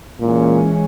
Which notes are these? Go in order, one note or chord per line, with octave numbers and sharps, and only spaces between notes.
A#2 E3 G#3 C#4